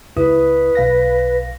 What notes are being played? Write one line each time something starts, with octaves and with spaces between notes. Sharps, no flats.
C#2 E4 B4 D#6
B1 F5 A#6